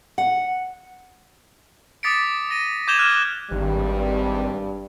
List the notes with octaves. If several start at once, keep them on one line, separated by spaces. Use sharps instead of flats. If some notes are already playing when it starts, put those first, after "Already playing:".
F#5
D6 D#6 A6 B6 C#7 D7
A#6 D#7
D6 G6 G#6 E7 F7 G7
F6 F#6
G#1 G2 G3